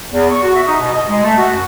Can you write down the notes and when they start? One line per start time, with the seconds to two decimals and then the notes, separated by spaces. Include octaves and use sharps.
0.12 E2
0.30 C#6
0.43 F#4
0.55 E5
0.67 D#4
0.80 B2
0.94 D#5
1.08 G#3
1.23 A3
1.37 F#4
1.53 F#2